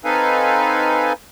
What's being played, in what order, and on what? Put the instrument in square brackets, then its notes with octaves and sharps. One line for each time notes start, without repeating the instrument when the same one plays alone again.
[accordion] C4 D#4 A4 B4 F5 G#5